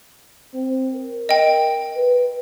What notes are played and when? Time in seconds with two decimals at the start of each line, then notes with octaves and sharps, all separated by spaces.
0.54 C4
0.94 A#4
1.29 D#5 G5
1.96 B4